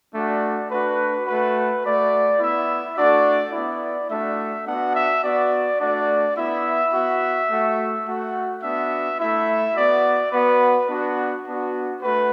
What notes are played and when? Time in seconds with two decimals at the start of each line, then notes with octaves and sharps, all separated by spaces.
0.14 A3 D4 F#4 D5
0.70 A3 D4 F#4 B4
1.27 A3 F#4 B4
1.83 A3 F#4 D5
2.40 B3 E4 E5
2.97 A3 D4 F#4 D5
3.53 B3 E4 D5
4.09 A3 D4 F#4 E5
4.67 B3 D4 F#4 F#5
4.95 E5
5.24 B3 F#4 D5
5.80 A3 D4 F#4 D5
6.36 B3 E4 E5
6.93 B3 F#4
7.49 A3 F#4
8.06 A3 F#4
8.62 B3 D4 F#4 E5
9.19 A3 E4 E5
9.75 B3 F#4 D5
10.32 B3 F#4 B4
10.88 B3 D4 F#4
11.46 B3 D4 F#4
12.01 A3 F#4 B4